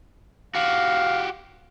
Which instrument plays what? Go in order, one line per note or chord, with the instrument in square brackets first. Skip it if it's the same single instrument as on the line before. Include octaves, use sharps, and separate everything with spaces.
[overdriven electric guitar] F#4 G4 [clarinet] F5